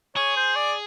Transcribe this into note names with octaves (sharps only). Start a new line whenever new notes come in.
G#4 C#5
C5
D5